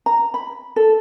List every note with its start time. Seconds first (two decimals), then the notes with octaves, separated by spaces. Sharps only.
0.06 A#5
0.34 B5
0.76 A4